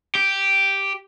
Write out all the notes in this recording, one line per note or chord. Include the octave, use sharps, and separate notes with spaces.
G4